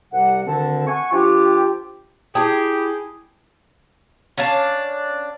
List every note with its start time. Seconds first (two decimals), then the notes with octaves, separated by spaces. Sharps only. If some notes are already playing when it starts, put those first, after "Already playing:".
0.12 C2 C3 G3 F#5
0.45 D2 D3 D#3 C4 A5
0.87 F#5 G#5 C#6
1.12 F3 D4 F4 G4
2.35 E4 G4 G#4 G5 A5
4.38 C#4 D4 F5 A5